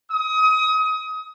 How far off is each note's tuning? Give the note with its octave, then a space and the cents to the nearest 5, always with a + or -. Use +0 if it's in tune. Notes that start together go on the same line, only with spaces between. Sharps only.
D#6 +30